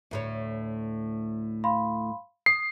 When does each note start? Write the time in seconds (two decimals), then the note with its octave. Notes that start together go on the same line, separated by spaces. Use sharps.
0.11 D2 A2 C#5
1.64 F5 B5 C6
2.46 D#6 C7